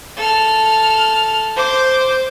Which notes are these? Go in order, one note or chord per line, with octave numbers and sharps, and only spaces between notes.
A4 F6
C5 D6